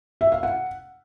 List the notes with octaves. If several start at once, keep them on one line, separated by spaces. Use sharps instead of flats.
E5
F5
F#5